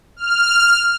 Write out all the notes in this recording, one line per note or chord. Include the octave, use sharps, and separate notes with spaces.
F6